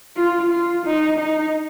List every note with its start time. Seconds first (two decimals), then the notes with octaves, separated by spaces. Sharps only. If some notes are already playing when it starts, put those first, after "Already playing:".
0.17 F4
0.51 F4
0.85 D#4
1.19 D#4